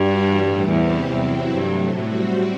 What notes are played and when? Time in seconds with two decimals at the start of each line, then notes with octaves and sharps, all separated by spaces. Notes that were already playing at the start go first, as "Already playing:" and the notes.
Already playing: G2 G3 D4 F#4
0.27 A2 E3 G3
0.69 E2 C3 E3 G3 C4 G4
1.11 E2 C3 F#3 C4 E4
1.53 G2 C3 F#3 A3
1.95 A2 G3 C4 F#4